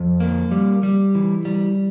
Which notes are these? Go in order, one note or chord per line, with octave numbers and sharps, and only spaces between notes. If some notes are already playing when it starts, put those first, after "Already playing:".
Already playing: F2
A#3
G3
G3
E3
G3